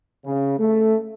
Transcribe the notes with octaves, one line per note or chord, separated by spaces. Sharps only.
C#3
A3